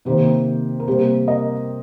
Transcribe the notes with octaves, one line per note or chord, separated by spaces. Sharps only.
C3 D#3 A#3 G4 C5
A#4
C3 G3 A#3 G4 C5
A#4 D#5